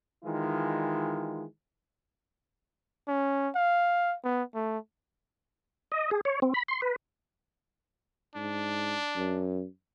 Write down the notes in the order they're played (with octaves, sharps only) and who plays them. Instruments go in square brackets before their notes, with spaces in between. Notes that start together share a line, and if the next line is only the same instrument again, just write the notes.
[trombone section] D#3 E3 G#3 F4
[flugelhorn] C#4
F5
B3
A3
[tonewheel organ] D#5
G#4
C#5
C4
B5
C6
B4
[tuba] G#2 [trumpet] D4
[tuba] F#2